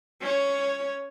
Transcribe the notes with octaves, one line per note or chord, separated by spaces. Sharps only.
C#4 C#5